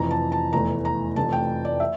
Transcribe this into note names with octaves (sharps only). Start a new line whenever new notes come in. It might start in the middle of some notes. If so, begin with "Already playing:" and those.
Already playing: F1 F2 E3 A#5
A5
A5
F1 E2 E3 A3 A#5
A#5
F1 F2 E3 A3 A5
G5
D5
E5